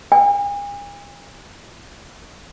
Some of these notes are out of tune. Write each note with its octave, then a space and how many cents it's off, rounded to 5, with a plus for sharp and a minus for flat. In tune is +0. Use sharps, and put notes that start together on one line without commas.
G#5 -40